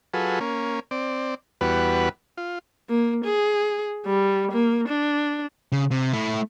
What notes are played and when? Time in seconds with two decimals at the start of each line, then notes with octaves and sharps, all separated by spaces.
0.14 F#3 F4 G#4 A4 B4
0.41 A#3 C#4
0.91 C4 D5
1.61 E2 G3 B3 F#4 B4
2.37 F4
2.89 A#3
3.24 G#4
4.06 G3
4.52 A#3
4.88 D4
5.72 C#3
5.91 C3
6.13 A3 E4